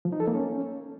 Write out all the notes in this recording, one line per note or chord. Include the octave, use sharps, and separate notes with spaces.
F3
D#4
A4
A#3
C#4